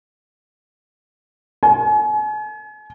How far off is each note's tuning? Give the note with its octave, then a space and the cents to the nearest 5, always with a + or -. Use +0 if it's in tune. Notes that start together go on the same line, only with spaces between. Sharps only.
G#5 +40